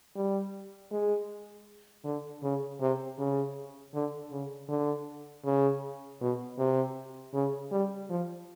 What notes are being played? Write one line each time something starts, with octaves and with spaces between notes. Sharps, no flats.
G3
G#3
D3
C#3
C3
C#3
D3
C#3
D3
C#3
B2
C3
C#3
G3
F3